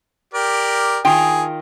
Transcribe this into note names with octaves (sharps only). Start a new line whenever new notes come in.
G4 A#4 D5
D#3 F4 G#4 G5